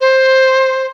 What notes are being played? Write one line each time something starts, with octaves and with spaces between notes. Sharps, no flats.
C5